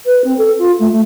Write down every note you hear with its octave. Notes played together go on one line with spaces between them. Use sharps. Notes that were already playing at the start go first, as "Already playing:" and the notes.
B4
C4
A4
F4
A3
A3